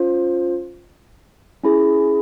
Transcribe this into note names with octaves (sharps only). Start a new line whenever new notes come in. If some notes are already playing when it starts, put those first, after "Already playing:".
Already playing: C#4 F4 C5
C#4 E4 G#4